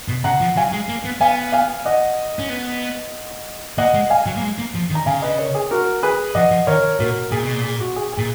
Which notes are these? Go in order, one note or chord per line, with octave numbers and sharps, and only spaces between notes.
B2
C#3 F#5 A#5
F3
F#3 F5 G#5
G#3
A#3
B3
B3 F5 G#5
F5 G#5
D#5 F#5
C#4
B3
A#3 D#5 F#5
G#3
F5 G#5
F#3
A#3
G#3
A#3
F3
D#3
A#5
C#3 F5 G#5
B4 D#5
A#4 C#5
G#4
F#4 A#4
G#4 B4
F3 D#5 F#5
F3
D#3 A#4 C#5
A#2 F#4 A#4
A#2 G#4
B2
A#2
G#4
F#4
G#4
G#4
A#2